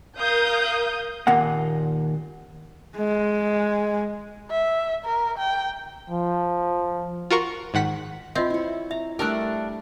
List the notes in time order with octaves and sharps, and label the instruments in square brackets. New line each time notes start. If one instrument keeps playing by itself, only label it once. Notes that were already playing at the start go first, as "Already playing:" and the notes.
[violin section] A#4 F5 D#6 G6
[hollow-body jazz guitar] D#2 A#2 A#3 F#5
[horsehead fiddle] G#3
[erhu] E5
A#4
G5
[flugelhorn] F3
[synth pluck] F4 F#4 A#4 C#6
G#2 D#3 F#5 B6
[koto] C4 [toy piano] F4 D#5 E5
[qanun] E4 C#5
[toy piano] E5 [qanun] A#5
[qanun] G3 A3 [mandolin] D4 E6 F#6 [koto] A#4